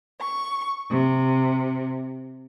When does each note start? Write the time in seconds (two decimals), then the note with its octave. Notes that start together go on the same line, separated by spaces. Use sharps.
0.20 C#6
0.90 C3